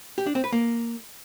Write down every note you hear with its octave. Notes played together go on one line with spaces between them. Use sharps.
G4
D4
C4
B4
A#3